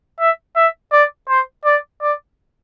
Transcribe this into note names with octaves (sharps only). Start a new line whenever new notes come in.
E5
E5
D5
C5
D5
D5